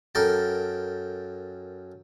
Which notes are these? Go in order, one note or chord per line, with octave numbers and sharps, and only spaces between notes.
F#2 A4 A#4 G5 A5